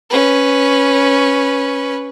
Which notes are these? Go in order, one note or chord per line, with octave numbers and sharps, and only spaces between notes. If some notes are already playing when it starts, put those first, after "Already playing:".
C#4 B4